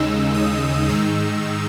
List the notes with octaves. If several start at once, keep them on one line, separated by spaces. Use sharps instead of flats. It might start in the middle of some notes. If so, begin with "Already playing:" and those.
Already playing: D#2 C#3 G#3 D#4 E6
D#6
G#2 D#3 G#3 D#4 E6